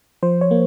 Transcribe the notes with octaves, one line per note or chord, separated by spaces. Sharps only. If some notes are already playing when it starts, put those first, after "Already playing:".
F3 C5
C#5
A#3